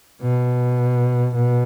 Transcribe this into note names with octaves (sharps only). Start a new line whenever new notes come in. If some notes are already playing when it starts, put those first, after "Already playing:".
B2
B2